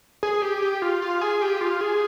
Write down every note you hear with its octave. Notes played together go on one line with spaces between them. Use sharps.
G#4
G4
G4
F4
F4
G#4
G4
F4
G#4